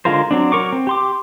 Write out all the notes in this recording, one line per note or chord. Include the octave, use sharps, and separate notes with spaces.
D3 G#3 F4 A#4 C5
F#3 C4 D4
F#3 A#4 C#6 D6
C4
G4 C6 D6